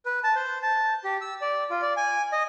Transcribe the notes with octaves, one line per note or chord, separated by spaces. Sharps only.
B4
A5
C5
A5
G4
E6
D5
F4
D5
G#5
D#5